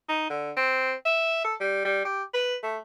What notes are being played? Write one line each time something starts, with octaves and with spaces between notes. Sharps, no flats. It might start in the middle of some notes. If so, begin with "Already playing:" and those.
D#4
D3
C4
E5
A4
G3
G3
G4
B4
A3